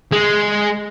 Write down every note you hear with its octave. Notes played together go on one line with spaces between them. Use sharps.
G#3